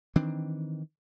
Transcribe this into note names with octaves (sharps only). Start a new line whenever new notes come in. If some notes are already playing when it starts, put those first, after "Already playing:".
D#3 E3 C4 D4